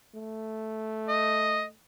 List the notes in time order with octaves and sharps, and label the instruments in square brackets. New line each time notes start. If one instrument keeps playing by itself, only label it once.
[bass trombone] A3
[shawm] D#5